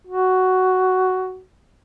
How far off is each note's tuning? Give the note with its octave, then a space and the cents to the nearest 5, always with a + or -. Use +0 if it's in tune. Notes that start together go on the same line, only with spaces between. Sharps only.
F#4 +5